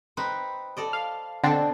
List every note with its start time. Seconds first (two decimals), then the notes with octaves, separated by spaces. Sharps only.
0.17 C4 D#4 B4
0.77 A4 D5 D#5
0.93 F5
1.44 B2 D3 C4 D4 A4